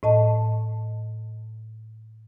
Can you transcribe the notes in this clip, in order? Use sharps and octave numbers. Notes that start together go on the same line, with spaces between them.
A2 D#5 A5